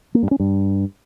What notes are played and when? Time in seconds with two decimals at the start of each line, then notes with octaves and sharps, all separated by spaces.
0.15 A#3
0.23 G2
0.31 C#4
0.40 G2